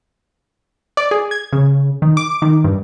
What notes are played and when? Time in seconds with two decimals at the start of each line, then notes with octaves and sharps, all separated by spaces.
0.97 D5
1.11 G#4
1.31 G#6
1.52 C#3
2.02 D#3
2.17 D6
2.42 D#3
2.64 G2